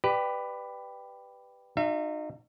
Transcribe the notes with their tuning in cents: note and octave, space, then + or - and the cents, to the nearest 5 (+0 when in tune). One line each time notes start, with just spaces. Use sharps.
G4 +0 B4 +10 D5 +30
D#4 -30 F#4 -35 E5 +35